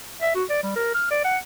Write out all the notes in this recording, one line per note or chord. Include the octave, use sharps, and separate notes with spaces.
E5
F#4
D5
G3
A#4
F6
D5
F#5